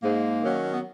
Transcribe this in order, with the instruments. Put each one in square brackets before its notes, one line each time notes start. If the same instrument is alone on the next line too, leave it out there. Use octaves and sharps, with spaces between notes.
[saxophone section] G#2 [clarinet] A#3
[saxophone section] D#3 F#3 C#4 F#4
[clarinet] B3